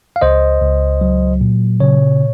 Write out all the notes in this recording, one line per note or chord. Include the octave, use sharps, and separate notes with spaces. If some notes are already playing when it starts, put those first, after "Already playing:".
F5
C#2 C5 D#5
C#2
F#3
A#2
C#3 C#5